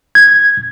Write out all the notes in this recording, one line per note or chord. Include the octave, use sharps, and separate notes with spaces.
G#6